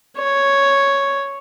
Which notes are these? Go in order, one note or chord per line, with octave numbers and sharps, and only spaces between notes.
C#5